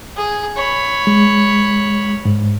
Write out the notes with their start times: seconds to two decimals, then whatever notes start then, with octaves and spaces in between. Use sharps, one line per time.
0.16 G#4
0.56 C#5 B5
1.07 G#3
2.25 G#2